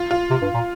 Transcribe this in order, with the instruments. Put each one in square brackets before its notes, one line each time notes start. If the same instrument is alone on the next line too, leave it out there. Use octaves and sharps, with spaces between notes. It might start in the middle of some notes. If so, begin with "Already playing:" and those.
Already playing: [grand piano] F4
F4
[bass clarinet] C3
G2
A#2